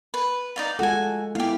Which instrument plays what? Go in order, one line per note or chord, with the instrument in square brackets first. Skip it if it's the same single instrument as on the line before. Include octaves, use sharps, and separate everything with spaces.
[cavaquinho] B4
D#4 D5 F5
[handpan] G#3 F4 A4 [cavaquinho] F#4 G#5
[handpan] A#3 B3 E4 [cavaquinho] G4 F5